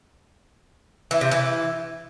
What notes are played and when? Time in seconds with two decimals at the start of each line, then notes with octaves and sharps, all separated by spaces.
1.11 E3
1.21 C3
1.31 E3